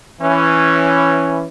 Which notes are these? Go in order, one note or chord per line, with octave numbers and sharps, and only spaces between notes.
E3 C#4